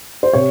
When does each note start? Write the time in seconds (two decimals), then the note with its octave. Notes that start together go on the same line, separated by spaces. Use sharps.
0.23 C5
0.33 C3 C#5